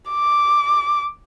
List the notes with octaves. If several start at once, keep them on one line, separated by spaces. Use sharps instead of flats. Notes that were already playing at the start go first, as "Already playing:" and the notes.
D6